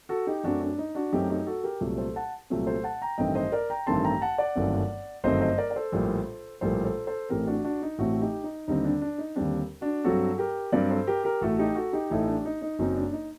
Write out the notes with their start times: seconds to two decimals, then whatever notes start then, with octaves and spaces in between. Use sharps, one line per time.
0.09 F#4 A4
0.27 D#4 G4
0.44 F#2 F#3 A3 C4 D4 F#4
0.61 D4
0.78 D#4
0.95 D4 F#4
1.13 F#2 F#3 A3 C4 D#4 G4
1.30 D#4 G4
1.46 F#4 A4
1.63 G4 A#4
1.81 C2 A#2 F#3 A3 C4
1.98 A4 C5
2.16 F#5 A5
2.50 C2 A#2 F#3 A3 C4
2.66 A4 C5
2.84 F#5 A5
3.02 G5 A#5
3.18 A1 G2 D#3 A3 C4 D#5 G5
3.35 C5 D#5
3.52 A#4 D5
3.70 G5 A#5
3.87 A1 G2 D#3 A3 C4 A5 C6
4.04 G5 A#5
4.22 F#5 A5
4.38 D5 F#5
4.55 G1 F#2 D#3 A3 C4
5.24 G1 F#2 D#3 A3 C4 C5 D#5
5.41 C5 D#5
5.58 A#4 D5
5.70 D5
5.76 A4 C5
5.92 A#1 A2 G3 A#3
6.61 A#1 A2 G3 A#3 A4 C5
6.84 A4 C5
7.07 A4 C5
7.29 A1 A2 A3 C4 G4 A#4
7.47 D4 F#4
7.65 D4 F#4
7.82 D#4
7.98 A1 A2 A3 C4 F#4 A4
8.21 D#4 G4
8.44 D#4
8.68 D#2 D3 G3 C4 D#4
8.84 D4
9.02 D4
9.18 D#4
9.36 D#2 D3 G3 C4 D4
9.81 D4 F#4
10.04 G2 F#3 C4 F#4 A4
10.38 G4 A#4
10.72 G2 F#3 C4 A#4 D5
10.90 A4 C5
11.07 G4 A#4
11.24 G4 A#4
11.41 A1 A2 A3 F#4 A4
11.59 D#4 G4
11.75 F#4 A4
11.93 D#4 G4
12.10 A1 A2 A3 D#4
12.28 D4
12.45 D#4
12.62 D#4
12.79 F#1 F#2 F#3 C4 D#4
12.96 D4
13.13 D#4